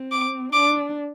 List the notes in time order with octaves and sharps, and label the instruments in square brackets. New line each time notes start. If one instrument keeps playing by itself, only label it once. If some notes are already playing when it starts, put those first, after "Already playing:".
Already playing: [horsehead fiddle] C4
[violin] D6
[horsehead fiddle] D4 [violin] D6